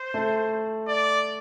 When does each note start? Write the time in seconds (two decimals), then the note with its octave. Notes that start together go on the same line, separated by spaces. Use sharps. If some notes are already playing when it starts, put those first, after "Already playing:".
Already playing: C5
0.14 A3
0.88 D5